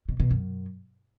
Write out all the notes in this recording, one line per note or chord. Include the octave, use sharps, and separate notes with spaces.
B2
B2
F#2